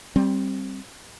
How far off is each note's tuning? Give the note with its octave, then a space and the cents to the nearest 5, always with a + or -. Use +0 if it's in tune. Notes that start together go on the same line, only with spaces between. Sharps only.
G3 +0 C4 +15